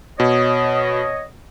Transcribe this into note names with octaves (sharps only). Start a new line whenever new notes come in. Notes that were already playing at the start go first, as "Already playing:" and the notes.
B2 C#5 D#5